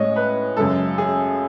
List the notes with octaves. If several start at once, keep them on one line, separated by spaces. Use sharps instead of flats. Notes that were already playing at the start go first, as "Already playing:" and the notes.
Already playing: A2 G#3 C#5 D#5
B4
F#2 C#3 G#3 A4
G#4